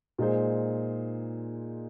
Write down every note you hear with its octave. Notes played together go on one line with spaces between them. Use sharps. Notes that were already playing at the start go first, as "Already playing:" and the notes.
A#2 G#3 D#4 G#4 C5